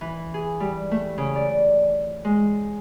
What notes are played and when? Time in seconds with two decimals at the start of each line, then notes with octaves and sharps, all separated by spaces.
0.01 E3
0.34 G#4
0.60 G3
0.91 A3
1.18 C#3
1.36 D5
2.25 G#3